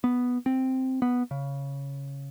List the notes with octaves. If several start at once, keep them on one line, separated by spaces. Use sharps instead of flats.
B3
C4
B3
C#3